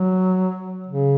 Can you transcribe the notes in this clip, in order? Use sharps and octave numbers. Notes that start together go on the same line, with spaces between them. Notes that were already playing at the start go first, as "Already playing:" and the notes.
Already playing: F#3
C#3